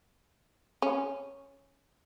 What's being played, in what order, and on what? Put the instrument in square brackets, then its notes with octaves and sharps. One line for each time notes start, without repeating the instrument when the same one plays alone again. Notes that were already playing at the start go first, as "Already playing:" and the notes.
[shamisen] C#4